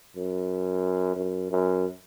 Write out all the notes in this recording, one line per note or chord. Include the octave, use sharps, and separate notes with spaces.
F#2
F#2
F#2